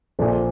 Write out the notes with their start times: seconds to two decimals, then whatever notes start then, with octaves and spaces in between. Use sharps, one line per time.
0.19 A#1 A#2 A4 C5